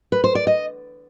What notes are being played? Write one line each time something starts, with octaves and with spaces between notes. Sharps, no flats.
B4
C5
D5
D#5